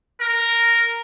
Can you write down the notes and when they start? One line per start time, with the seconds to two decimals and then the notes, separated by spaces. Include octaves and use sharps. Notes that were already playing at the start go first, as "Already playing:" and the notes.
0.21 A#4